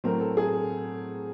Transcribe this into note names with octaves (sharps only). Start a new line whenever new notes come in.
A2 F#3 A3 C4 A#4
A4
G#4